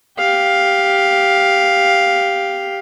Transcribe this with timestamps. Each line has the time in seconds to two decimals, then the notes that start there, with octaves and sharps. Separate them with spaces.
0.19 G4 F5